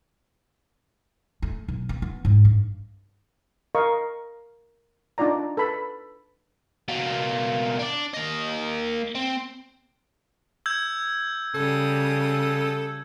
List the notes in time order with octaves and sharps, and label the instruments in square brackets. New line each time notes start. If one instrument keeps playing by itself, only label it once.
[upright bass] A3
B1
B3
B3
G#2
G2
[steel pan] A#4 D#5 F5 C#6
D4 D#4 F4 D5 A#5
A4 B4 B5
[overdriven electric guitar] B2 A#3
D4 D5
A#3 D#5
C4
[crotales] E6 G6 G#6
[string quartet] C#3 G3 D#6 [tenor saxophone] A4